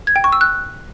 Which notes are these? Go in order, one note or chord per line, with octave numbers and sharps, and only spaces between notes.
G#6
G5
C#6
E6
F#6